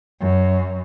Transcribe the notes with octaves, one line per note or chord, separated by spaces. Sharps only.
F#2